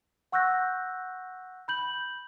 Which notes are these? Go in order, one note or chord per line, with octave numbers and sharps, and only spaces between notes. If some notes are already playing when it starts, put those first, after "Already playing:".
F#5 C#6 E6 F#6 G6 A#6
B5 G6 F#7